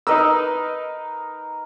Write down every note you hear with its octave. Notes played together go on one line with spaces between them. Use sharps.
D#4 A#4 B4 D#5 E6